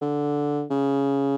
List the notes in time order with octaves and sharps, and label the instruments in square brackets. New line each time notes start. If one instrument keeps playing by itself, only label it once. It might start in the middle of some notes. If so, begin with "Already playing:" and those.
[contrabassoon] D3
C#3